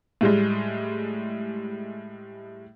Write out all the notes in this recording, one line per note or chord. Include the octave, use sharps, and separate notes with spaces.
A2 G3 G#3